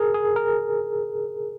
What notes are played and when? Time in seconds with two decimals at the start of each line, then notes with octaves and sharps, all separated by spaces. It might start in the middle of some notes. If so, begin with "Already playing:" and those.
Already playing: G#4 A#4
0.14 G#4
0.36 A#4